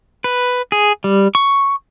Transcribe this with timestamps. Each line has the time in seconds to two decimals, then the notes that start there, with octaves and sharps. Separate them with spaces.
0.24 B4
0.72 G#4
1.04 G3
1.35 C#6